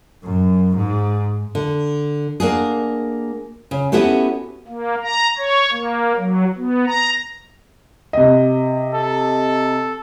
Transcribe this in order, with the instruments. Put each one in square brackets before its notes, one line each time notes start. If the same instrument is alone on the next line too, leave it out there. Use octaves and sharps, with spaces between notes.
[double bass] F#2
G#2
[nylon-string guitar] D3
A#3 D4 F#4 G#4
C#3
B3 C#4 E4 F#4 G4 A4
[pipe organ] A#3
A#5
C#5
A#3
F#3
B3
A#5
[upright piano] C3 D#5
[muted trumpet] A4